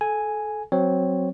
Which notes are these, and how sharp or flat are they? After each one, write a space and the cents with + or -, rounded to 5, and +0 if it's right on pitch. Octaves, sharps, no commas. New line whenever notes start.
A4 -25 G#5 +0
F#3 +0 C4 +0 C#5 +0